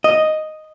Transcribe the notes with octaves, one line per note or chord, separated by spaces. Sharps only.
D#5